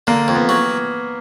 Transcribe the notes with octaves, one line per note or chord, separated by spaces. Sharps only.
D3 A#3
F2
B3
F#3